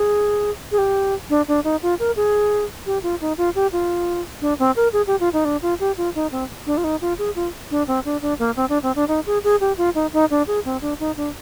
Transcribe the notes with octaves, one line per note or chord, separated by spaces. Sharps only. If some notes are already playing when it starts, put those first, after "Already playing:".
Already playing: G#4
G#4
G4
D4
D4
D#4
F4
A#4
G#4
G4
F4
D#4
F4
G4
F4
D4
C4
A#4
G#4
G4
F4
D#4
D4
F4
G4
F4
D#4
C4
D4
F4
D#4
F4
G#4
F4
D4
C4
D4
D4
A#3
C4
D4
C4
D4
D#4
G#4
G#4
G4
F4
D#4
D#4
D4
G#4
C4
D4
D#4
D4